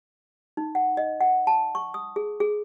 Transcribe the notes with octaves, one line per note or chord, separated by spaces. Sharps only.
D#4
F#5
D#5
F#5
A5
C#6
D#6
G#4
G#4